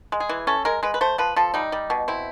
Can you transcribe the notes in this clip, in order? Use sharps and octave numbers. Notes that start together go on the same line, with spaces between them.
G#3
G#4
E3
C#4 A4
G#3 A#4
G#3 B4
B4
A3 C5
F3 B4
F3 A4
G3 D#4
G3
B2
C4 E4